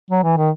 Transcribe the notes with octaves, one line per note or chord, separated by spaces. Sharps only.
F#3
E3
D#3